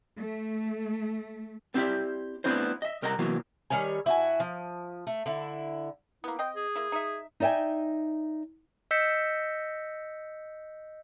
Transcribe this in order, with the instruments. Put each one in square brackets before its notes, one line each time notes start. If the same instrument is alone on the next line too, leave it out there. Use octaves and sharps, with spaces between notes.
[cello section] A3
[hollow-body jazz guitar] B3 C4 E4 G4 D5 E5
A3 B3 C4 D4 E4 C5
D#5 E5
C2 A#4 D#5 F#5 A#5
C3 E3 F#3 A#3 B3
[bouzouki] D#3 G3 C#5 G#5
E4 F#4 G#5
F3
A3
D3 E4
[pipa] A#3 B3 [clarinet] E4
[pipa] C4 D#5 [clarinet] G5
[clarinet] G#4
[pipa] A#3 E4
D#4 E5
[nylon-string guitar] D#4 D5 E5 G5 G#5
[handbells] D#5 E6 G6 B6 C#7